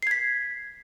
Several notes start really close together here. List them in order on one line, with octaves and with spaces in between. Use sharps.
C7 G#6 B6